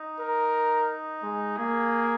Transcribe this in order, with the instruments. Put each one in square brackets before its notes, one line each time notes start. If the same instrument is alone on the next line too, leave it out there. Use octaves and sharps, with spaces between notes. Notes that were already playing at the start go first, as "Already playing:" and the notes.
Already playing: [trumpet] D#4
[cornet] A#4
G#3
[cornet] A#3 [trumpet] G#4